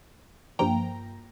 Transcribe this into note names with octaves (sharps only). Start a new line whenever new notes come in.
G2 F3 A#3 G5 A#5